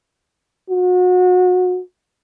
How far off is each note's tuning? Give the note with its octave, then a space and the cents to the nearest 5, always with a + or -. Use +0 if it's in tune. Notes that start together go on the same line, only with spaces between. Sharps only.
F#4 -30